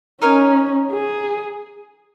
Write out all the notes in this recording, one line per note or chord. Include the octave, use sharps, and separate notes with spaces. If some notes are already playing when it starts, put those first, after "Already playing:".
C#4 D#4 A#4 C#5 G#5
G#4